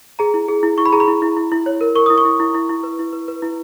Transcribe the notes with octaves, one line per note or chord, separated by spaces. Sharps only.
G#4 A#5
E4
G#4
E4
E4 C#6
B5
G#4 A#5
B5
E4
E4
E4
E4
C#5
A#4
A#4 C#6
E4 D#6
C#6
E4
E4
E4
E4
B4
E4
B4
B4
E4